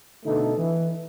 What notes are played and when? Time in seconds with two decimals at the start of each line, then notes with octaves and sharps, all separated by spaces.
0.25 B2 D3 A3 D#4 A4
0.57 E3